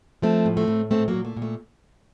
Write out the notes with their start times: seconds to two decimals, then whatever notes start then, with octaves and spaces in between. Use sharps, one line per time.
0.22 F3 A3 C4
0.46 A2
0.57 A3 C4
0.68 A2
0.90 A#2 A3 C4
1.08 F#3 A#3
1.14 A#2
1.25 A3
1.37 A#2
1.42 A3